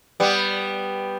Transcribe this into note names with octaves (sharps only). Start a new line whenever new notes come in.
G3 B3